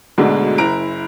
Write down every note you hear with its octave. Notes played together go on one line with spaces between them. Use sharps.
D2 G#2 B2 D3 G#3
F#1 E4 A#5 D7